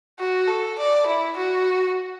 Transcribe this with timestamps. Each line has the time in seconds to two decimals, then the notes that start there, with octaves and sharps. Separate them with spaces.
0.19 F#4
0.48 A4
0.78 D5
1.07 E4
1.37 F#4